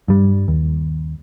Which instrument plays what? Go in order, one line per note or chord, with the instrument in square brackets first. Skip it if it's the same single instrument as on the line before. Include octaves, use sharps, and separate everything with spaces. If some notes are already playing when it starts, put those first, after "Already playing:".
[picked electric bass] G2 G3
D#2